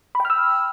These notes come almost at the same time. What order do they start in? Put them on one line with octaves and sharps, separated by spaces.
B5 G5 F6 E6